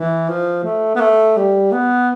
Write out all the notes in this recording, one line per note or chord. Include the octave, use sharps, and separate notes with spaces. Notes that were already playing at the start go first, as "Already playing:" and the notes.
Already playing: E3
F3
A3
B3
A3
G3
B3